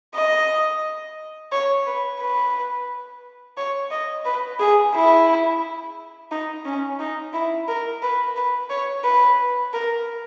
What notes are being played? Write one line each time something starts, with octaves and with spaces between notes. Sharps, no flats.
D#5
C#5
B4
B4
C#5
D#5
B4
G#4
E4
D#4
C#4
D#4
E4
A#4
B4
B4
C#5
B4
A#4